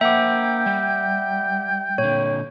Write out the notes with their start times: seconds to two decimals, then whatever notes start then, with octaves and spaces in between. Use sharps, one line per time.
0.01 A#3 C5 E5 F#5 G5 D6
0.66 G3
1.98 A#2 D3 C#5